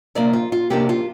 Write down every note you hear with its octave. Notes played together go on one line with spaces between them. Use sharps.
C3 F3 A#3 D4 D5
F4
F4
C3 F3 A#3 D4 G4
F4